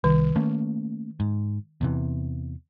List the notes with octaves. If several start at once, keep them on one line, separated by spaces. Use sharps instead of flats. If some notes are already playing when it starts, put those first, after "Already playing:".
C2 D#3
A3 A#3 C#4
G#2
E2 C3 E3